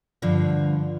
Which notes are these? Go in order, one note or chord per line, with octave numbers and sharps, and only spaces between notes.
G2 D3 F3